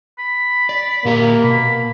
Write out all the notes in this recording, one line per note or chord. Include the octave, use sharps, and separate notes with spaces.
B5
D5
A#2 A#3 G4 E5
B2 B5